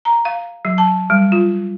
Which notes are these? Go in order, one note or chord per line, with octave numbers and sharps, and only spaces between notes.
A#5
F5
F#3
A5
G3
F4